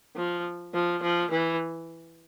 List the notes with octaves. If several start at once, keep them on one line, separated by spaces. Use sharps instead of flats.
F3
F3
F3
E3